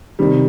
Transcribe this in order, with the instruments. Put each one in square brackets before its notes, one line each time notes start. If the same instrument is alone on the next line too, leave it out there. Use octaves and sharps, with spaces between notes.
[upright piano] C3 D#3 G3